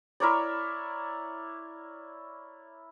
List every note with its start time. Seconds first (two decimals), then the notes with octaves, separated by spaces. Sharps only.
0.20 E4 A#4 C#5 D5